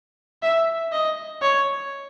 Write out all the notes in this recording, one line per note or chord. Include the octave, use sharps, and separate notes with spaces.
E5
D#5
C#5